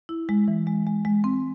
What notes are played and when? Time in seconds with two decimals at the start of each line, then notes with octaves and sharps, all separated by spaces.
0.09 E4
0.29 G#3
0.48 E3
0.67 G#3
0.87 G#3
1.05 G#3
1.24 C4